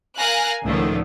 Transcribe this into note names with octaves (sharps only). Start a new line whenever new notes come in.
A#4 F5 G#5 F#6 A#6
C#2 A2 D3 D#3 F3 A3